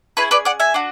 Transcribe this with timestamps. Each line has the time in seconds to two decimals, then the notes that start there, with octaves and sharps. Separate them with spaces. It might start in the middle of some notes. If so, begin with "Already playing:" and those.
0.17 C#4 E4 G#4 B4
0.31 B4 D5
0.45 D5 F#5
0.60 E5 G#5
0.74 D4 F#4